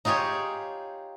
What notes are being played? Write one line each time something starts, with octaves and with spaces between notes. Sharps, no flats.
D#4 F4 G4 G#4 C#5